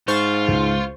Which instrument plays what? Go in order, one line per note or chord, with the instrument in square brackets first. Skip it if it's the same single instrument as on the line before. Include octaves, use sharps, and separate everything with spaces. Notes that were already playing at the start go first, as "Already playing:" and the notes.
[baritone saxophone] G#2 [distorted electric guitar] F4 [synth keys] C5 C#6 A6
[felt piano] C#2